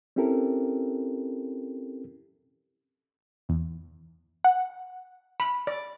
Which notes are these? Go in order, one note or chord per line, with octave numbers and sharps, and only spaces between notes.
C4 C#4 E4 G4 A4 A#4
E2
F#5
B5
D5